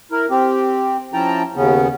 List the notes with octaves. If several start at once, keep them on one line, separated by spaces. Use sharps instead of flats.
E4 A#4
C4 G4
F3 C#4 E4 G5 A5 A#5
D#2 C#3 B3 C#4